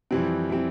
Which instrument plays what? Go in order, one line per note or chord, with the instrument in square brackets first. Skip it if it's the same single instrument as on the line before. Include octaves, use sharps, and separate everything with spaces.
[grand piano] F2 E3 G3 C4
E3 G3 C4